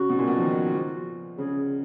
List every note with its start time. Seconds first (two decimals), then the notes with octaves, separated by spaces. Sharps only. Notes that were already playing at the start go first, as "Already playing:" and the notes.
Already playing: C#3 F#4
0.09 B2
0.18 A#2
0.27 B2
0.37 F3
0.42 D#3
0.74 F3
1.38 C#3 G#4